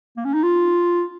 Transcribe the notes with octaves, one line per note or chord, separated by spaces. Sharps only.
A#3
C#4
D#4
F4